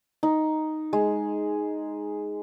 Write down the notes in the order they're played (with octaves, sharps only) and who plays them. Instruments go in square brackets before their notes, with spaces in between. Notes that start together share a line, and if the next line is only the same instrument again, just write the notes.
[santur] D#4
G#3